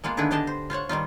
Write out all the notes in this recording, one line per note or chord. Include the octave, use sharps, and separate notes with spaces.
G#3 A#3 B3 F4
D3 D#3 D4 E4 G#4 B4
D3 D4 G4 D#5 A5
C5
F4 C5 C#5 F#5
D#3 G3 D#4 F4